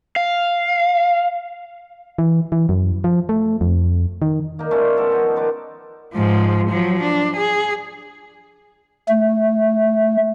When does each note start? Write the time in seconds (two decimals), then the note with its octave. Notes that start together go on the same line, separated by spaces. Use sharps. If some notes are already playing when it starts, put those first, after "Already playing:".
0.16 F5
2.18 E3
2.52 E3
2.69 F#2
3.04 F3
3.29 A3
3.61 F2
4.22 D#3
4.59 A#3 D#4
4.71 A3 C#4 D4 F4
4.96 F3 B3 A4 A#4
5.12 F3 B3 D#4
5.36 D#3 B4 C5 D6
6.14 G#2 F3
6.70 F3 F#3
7.03 D4
7.36 G#4
9.08 A3